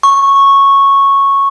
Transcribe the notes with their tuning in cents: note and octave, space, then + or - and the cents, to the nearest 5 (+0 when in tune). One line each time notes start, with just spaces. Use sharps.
C#6 -10